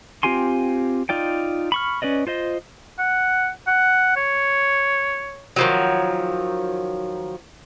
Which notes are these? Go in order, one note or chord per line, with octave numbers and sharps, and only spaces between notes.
C4 F4 G4 G#5 C6
D#4 F4 D5 G5
B5 C#6 F6
C#4 B4 D5 D#5
F4 C5 D#5
F#5
F#5
C#5
D#3 F3 F#3